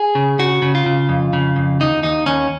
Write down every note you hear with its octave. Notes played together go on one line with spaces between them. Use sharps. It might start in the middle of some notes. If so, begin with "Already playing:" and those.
Already playing: G#4
C#3
C#3 F#4
C#3
F4
C#3
F2
C#3
F2
D#2 D#4
D#2 D#4
D#2 C#4